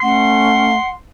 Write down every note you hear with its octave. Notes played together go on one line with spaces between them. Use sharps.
A3 C#4 F#5 C6